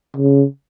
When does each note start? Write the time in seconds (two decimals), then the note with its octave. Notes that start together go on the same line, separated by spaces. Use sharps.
0.17 C#3